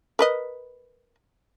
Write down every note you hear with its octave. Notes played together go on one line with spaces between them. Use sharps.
A#4 B4 D#5